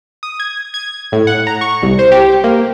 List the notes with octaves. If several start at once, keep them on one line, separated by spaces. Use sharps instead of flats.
D#6
G#6
G#6
A2
F#5
A#5
C#6
C2
C5
G4
A#3